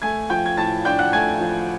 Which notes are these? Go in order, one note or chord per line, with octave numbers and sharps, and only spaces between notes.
A3 G#5 G#6
F3 G5 G6
G#6
A2 A5 A6
D4 G5 G6
F#5 F#6
A3 G#5 G#6
F3